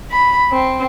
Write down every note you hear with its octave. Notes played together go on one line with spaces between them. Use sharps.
B5
C4